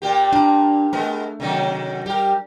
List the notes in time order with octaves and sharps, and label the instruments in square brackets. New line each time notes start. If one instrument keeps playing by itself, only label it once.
[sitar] A#2 A#3 G4
[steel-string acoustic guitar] D4 A#5
[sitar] G#3 B3 A#4 [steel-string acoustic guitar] A3
[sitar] C3 D#3 F#3
[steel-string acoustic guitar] G3 [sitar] G4 A#4